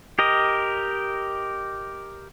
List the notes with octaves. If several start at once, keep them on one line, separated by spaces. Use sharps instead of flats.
G4 A#4 D#5